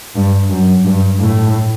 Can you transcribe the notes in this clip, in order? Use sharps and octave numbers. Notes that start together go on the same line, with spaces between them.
G2
F#2
G2
A2